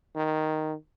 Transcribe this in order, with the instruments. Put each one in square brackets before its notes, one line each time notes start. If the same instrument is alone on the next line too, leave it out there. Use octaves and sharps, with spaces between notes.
[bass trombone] D#3